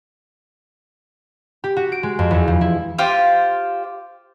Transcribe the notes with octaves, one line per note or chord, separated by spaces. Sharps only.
G4
F#4
D7
G#3
F2
E2
F3
E4
F4 G4 C5 F5